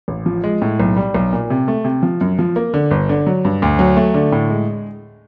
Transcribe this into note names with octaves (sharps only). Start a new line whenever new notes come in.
A1
F3
G#3
A2
B1
G3
B1
A#2
C3
A3
C3
F3
F#2
F3
A#3
D3
G1
D3
F#3
G2
D2
F#3
A3
D3
A2
G#3